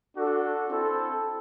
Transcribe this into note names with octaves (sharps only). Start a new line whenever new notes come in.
D4 F#4 A4
C4 E4 A4